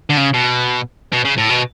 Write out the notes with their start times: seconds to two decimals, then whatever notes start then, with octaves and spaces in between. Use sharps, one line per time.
0.10 D3
0.17 C#3
0.34 B2
1.13 B2
1.25 C#3
1.38 A2
1.50 B2